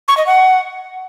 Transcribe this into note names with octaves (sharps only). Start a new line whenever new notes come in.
C#6
D#5
F#5